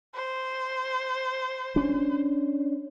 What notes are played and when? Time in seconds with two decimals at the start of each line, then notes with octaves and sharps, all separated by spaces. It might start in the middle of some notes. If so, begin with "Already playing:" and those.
0.15 C5
1.76 C#4 D4